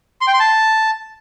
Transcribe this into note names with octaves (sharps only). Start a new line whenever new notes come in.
C6
G5
C6
A5